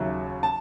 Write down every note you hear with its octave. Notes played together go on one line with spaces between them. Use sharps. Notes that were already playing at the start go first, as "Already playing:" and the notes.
Already playing: D#2 C#3 F#3 E5
A5